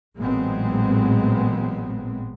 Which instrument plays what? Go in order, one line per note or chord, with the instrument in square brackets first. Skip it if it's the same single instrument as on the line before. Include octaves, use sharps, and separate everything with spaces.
[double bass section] A1 A#2 F#3 G#3 B3 C4